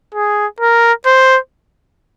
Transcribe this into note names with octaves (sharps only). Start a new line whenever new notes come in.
G#4
A#4
C5